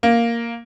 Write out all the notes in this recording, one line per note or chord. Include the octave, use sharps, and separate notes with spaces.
A#3